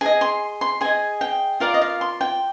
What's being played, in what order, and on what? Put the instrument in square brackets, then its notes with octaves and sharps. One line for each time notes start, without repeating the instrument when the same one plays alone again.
[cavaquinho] G#4 D#5 G#5
C6
C6
G#4 D#5 G#5
G5
F4 A#4 D5 F5
D#5
F5
C6
G5